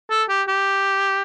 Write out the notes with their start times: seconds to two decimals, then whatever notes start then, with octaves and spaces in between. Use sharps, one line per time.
0.10 A4
0.29 G4
0.48 G4